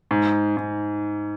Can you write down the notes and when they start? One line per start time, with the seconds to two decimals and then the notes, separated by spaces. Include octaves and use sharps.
0.11 G#2
0.57 G#2